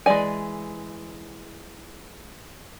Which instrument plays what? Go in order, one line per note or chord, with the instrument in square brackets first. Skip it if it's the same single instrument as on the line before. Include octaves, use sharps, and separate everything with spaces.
[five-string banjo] E3 G#3 A3 D5 G#5